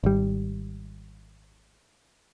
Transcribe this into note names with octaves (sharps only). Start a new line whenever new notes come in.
G#1 G3